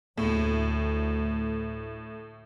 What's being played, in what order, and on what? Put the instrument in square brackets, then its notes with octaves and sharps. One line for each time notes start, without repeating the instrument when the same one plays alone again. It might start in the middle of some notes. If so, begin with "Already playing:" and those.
[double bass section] D2 [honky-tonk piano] A2